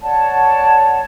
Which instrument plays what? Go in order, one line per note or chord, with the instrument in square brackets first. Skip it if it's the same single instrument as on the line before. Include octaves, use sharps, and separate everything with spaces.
[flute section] C#5 D5 F#5 A5